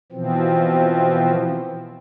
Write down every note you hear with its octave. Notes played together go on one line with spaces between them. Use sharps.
B2 E3 F3 C4